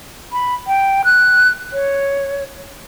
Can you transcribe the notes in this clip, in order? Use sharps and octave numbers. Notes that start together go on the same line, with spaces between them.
B5
G5
F#6
C#5